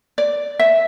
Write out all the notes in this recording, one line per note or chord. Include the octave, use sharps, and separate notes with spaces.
D5
E5